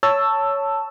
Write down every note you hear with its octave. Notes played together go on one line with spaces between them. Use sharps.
C#5 A5 E6